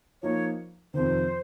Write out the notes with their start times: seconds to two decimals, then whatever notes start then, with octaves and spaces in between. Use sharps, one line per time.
0.23 F3 A#3 D#4 C#5
0.94 F2 C3 D#3 C5